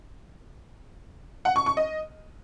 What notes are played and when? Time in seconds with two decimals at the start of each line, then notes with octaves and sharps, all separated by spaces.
1.45 F#5
1.56 C#6
1.66 C#6
1.77 D#5